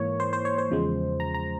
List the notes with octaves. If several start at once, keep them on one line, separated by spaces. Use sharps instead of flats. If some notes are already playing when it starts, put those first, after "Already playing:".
Already playing: G#2 E3 A#3 C#5
C5
C5
C#5
C5
E2 C#3 F3 G#3
A#5
A#5